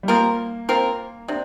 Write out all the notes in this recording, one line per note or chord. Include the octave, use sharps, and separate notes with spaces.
G3
F3 A#3 C4 F4 A#4
F3 C4 F4 A#4
C3 D4